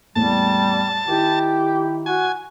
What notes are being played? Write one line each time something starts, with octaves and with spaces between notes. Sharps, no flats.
E2 A2 G3 A#3 A5
D#3 E4 G4 A#4
F#4 G#5